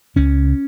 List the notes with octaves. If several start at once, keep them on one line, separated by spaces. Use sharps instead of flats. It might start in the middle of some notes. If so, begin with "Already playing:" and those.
C#2 C#3 C#4